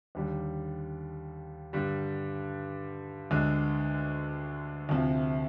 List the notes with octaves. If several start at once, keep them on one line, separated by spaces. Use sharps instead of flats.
D#2 D3 G3
G2 D3 G3
D2 D3 G#3
D2 C3 F3 C4